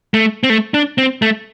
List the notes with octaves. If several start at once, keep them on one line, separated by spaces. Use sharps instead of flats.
A3
C4
A3
D4
C4
A3